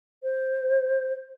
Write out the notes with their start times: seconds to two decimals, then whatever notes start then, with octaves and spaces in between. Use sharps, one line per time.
0.23 C5